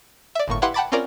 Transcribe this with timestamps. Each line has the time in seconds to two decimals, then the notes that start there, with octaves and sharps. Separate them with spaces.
0.35 D5 E5
0.48 G1 A2 A#3 C#6
0.62 E4 G4 B4 F5 F#5 C6
0.74 F#5 G5 A5 B5 D6 A6
0.92 C4 C#4 F4 A#4 D5